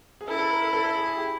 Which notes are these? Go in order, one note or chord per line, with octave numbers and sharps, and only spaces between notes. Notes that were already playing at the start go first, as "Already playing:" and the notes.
G#4
E4 A4
A4
A#4
A4
A4
A4
G#4
G#4
G4